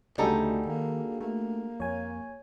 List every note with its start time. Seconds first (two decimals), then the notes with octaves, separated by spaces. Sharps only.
0.18 D2 C#3 G3 D4 D#4 F#4 G#4 A4
0.66 D#3 A#3
1.21 A3 A#3
1.80 F2 C#5 G#5